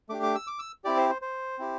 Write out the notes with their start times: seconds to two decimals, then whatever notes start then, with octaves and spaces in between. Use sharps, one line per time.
0.09 A3 D4 G4 D6
0.23 D6
0.35 E6
0.47 D6
0.59 E6
0.84 C4 E4 G4 D5
0.97 C5
1.09 C5
1.22 C5
1.59 C4 E4 G4